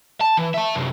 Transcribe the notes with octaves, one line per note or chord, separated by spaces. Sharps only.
A5
E3
E5 A5
F#2 C3